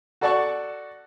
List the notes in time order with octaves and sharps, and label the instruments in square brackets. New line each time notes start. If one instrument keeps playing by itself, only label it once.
[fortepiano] F#4 A4 D5 F#5 A5 C#6